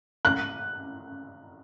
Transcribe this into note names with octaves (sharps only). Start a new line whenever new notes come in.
F#6